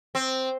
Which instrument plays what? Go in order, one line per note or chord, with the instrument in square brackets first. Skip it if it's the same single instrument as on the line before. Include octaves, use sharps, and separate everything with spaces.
[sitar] C4